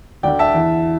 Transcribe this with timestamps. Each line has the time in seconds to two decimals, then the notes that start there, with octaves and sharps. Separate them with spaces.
0.23 D2 D3 D5 G5
0.39 E5 A5
0.55 E2 E3